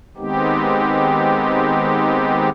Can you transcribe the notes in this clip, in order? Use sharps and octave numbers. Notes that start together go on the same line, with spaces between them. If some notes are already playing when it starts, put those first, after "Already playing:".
D#3 G#3 B3 C4 D#4 G4